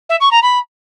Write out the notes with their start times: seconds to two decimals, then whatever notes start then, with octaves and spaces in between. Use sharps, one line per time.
0.09 E5
0.20 C#6
0.31 A#5
0.42 B5